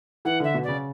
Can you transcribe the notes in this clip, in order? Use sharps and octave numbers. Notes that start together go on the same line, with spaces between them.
E3 F#5
D3 E5
B2
C#3 D5